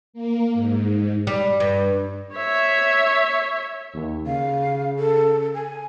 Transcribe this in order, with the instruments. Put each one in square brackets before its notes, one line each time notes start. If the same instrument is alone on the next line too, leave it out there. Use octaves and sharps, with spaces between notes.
[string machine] A#3
G#2
[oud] G3
G2
[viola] C#5 E5
[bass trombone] D#2
[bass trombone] C#3 [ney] F5
[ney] A4
G#5